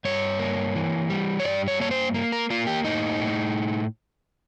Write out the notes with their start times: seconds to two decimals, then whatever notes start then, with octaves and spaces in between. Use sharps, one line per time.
0.05 G2 C#5
0.39 A#3
0.75 E3
1.10 G3
1.40 C#5
1.45 G2 D5
1.68 C#5
1.80 A#3 C#5
1.91 C5
2.14 A#3
2.32 A#4
2.50 A#3 F4
2.67 G4
2.84 A2 D#4
3.20 A2